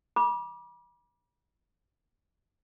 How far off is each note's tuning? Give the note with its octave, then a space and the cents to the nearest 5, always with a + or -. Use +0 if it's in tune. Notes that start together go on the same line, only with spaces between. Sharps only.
B5 -40 D6 +0